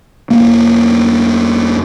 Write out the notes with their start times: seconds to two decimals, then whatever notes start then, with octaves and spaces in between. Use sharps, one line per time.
0.30 F1 A#3